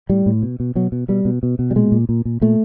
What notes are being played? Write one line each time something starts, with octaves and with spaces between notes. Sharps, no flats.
A2 G3
A2
B2
B2
B2 F#3
B2
B2 G3
B2
B2
B2
G3
A#2 G#3
A#2
A#2
A#2
A#2 A3